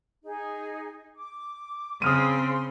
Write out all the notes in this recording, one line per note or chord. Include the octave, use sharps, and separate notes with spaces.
D#4 G#4
D6
C#3 C4 C6 D#6 F6 D#7